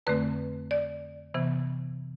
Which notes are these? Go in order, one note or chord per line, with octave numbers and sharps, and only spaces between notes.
F2 D3 A3 C4 B4
D5
C3 E3 B3